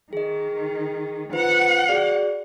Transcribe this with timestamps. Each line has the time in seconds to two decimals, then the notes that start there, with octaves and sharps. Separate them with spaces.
0.13 D#3 G#4 D#5
1.33 F4 B4 C5 F#5
1.89 F#4 G#4 D5